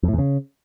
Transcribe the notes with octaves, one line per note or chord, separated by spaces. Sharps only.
F2
A2
E2
C#3